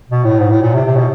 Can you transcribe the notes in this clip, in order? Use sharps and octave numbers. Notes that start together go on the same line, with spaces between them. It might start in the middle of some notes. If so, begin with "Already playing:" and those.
B2
A2
G#2
A2
A#2
C3
C3
B2